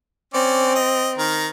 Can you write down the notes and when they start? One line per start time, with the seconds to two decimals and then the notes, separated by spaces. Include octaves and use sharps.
0.34 C4 C#4 D5
0.75 D#5
1.18 D#3 A#4